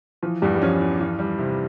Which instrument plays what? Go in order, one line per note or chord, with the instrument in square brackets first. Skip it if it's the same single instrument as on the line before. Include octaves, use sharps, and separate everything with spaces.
[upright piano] E3 [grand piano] F3
[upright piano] E2 [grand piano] G2 G3
[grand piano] G3
[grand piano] F3 [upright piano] C#4
[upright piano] E2
E3
G3
C3